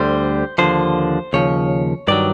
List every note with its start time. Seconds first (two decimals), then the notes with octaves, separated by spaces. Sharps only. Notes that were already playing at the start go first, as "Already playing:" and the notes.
Already playing: D2 D3 G3 C5
0.58 D#2 D3 F3 C5
1.33 D#2 C#3 F3 C#5
2.08 G2 D#3 F#3 D5